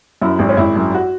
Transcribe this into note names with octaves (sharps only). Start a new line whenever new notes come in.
F#2 E4
G#1
C#4
G#1 E4
F#2
F#4